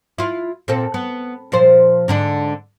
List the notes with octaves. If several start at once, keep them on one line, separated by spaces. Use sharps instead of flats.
E4 F4
A#2 C4 A4
B3
A#2 F3 C5
G#2 D3 D4